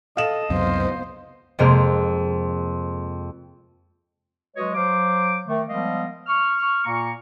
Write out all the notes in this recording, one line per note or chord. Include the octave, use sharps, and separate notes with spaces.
A4 D#5 F5 E7
C#2 F#2 C3 B3 C5
F2 C3 G#3 A#3 F6
F#3 G#3 F#4 B4 C#5 D#5
F#3 C5 F5 D6
D#3 A3
F3 G3 G#3 B3 D#5 F5
C#6 F6
A#2 A#3 A#5 C#6